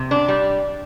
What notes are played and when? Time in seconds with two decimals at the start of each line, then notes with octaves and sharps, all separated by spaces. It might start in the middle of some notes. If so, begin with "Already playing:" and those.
Already playing: C3
0.11 D4
0.28 G3